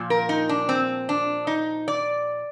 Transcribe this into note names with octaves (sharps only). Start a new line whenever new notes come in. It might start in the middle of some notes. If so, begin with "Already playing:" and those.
Already playing: A#2 F3
A#4
D#4
D4
C4
D4
D#4
D5